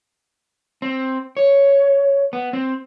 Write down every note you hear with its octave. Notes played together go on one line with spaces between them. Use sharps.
C4
C#5
B3
C4